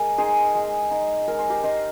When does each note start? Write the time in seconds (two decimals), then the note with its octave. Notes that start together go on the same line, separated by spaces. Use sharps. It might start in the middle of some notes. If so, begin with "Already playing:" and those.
Already playing: G#3 A#4
0.18 D#4 G#4 C5
0.55 G#3
0.91 D#4
1.28 G#3 A#4
1.39 C5
1.50 G4 A#4
1.63 D#4 C5 D#5